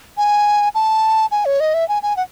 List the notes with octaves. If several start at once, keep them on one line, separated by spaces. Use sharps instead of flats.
G#5
A5
G#5
C#5
D#5
E5
G#5
G#5
F#5